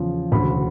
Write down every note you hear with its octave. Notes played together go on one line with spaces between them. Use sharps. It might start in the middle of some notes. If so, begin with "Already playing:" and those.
Already playing: E2 C#3 F3
E1 D2 C#3 B5